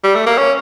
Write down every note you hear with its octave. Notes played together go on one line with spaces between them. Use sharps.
G3
A3
A#3
C#4